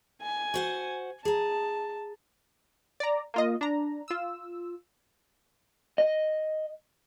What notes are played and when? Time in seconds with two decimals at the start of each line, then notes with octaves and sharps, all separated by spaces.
0.22 G#5
0.54 F#4 C5 F#5
1.25 G#4 A5 A#5
3.00 D5 A#5
3.34 A#3 F4 D#5
3.61 D4 A#5
4.08 F4 E6
5.98 D#5